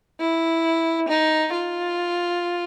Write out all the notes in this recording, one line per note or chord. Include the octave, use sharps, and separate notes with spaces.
E4
D#4
F4